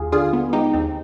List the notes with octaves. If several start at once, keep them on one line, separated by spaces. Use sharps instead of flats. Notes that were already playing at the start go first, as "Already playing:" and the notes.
Already playing: D#2 F4 G4 G#4
D3 F4 G#4
B3
G#3 D#4 G4
D#2 C4